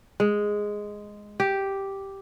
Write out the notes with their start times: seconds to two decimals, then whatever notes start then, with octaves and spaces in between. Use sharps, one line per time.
0.20 G#3
1.40 G4